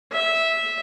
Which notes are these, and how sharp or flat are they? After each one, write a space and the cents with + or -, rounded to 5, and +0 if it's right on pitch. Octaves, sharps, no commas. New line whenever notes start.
E5 -10